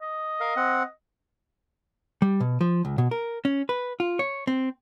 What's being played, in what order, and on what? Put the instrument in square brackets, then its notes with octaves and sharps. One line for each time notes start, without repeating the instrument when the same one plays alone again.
[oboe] D#5
[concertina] A#4 F5
C4 F#5
[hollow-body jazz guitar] G3
B2
F3
C#2
B2
A#4
C#4
B4
F4
C#5
C4